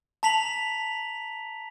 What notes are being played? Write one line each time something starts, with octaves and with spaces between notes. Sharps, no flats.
A5 A#5 B6 F7 F#7